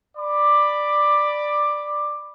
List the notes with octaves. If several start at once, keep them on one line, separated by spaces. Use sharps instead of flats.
D5 B5 D6